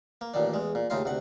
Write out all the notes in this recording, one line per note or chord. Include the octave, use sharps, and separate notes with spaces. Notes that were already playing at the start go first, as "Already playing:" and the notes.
A#3
A1 A#2 D#3 D4
E2 G#3
A#2
D#2 A2 C#3 D#4 F4 C6
D2 C3 F#5